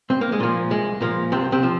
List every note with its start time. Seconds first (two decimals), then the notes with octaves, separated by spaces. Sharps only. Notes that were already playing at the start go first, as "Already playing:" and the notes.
0.10 C2 C4
0.21 A#3
0.32 G#3
0.40 A#2 F3 A#3
0.70 C2 G#3
1.01 A#2 F3 A#3
1.32 C2 C3 C4
1.52 C3 C4
1.63 F3